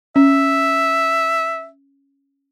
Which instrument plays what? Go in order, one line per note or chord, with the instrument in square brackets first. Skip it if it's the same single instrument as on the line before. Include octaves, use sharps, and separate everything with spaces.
[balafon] C#4 [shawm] E5